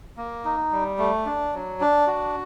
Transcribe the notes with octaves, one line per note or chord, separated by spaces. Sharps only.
A#3
D#4
G3
A3
D4
F#3
D4
F#4